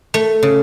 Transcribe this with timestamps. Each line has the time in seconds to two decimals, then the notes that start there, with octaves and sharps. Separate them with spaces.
0.14 A3
0.43 C#3